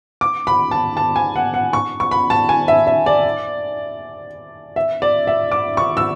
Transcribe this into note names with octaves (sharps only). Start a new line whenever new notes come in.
D6
B5
A5
A5
G#5
F#5
F#5
C#6
C#6
B5
A5
G#5
E5
E5
D5
E5
D5
E5
D6
C#6
E6